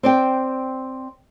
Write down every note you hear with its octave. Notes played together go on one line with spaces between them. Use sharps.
C4 D5 G5